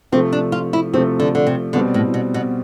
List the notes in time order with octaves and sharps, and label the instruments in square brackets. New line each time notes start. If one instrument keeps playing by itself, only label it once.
[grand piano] C3 F3 A3 [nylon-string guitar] C4
[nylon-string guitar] D4
F4
E4
[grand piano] C3 F3 A3 [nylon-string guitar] C4
[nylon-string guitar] D3
D3
C3
[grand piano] B2 G3 C4 [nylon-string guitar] D3
[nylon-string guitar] A2
B2
B2